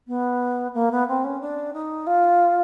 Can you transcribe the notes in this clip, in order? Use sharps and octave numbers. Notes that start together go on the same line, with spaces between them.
B3
A#3
B3
C4
C#4
D4
D#4
F4